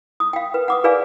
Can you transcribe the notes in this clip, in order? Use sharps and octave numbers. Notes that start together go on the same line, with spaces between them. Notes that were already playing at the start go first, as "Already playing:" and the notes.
D#6
F5 G5
B4
F#5 D6 D#6
G#4 B4 D5 F5 G#5